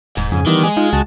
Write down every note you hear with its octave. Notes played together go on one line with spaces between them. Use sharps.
D#1 G#2
F2 C#3 G#4
D#3 E3 G3 B3 D6
G#3 G#4
D#4 F4
C#2 F#4 A5